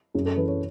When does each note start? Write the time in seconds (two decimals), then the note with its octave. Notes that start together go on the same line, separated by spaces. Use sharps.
0.14 F#2 G#4
0.26 A4
0.37 E3 B4
0.48 C#5